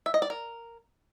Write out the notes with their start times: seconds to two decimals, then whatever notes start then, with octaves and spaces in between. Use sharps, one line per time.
0.06 E5
0.14 D#5
0.22 D5
0.30 A#4